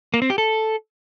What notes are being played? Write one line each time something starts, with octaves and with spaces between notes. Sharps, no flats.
A#3
C4
G4
A4